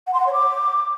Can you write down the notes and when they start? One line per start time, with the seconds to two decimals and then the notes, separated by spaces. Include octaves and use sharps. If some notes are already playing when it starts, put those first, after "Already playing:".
0.07 F#5
0.13 C6
0.20 F#5
0.26 C#5
0.33 D6